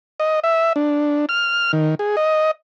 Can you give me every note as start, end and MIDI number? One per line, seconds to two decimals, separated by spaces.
0.20 0.40 75
0.44 0.73 76
0.76 1.26 62
1.29 1.72 89
1.73 1.95 51
1.99 2.16 68
2.17 2.51 75